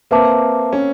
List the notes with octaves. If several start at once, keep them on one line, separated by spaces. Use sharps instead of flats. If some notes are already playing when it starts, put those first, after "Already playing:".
A#3 C4 B4 E5 A5 D6
C#4